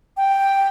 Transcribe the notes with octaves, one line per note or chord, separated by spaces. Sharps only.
G5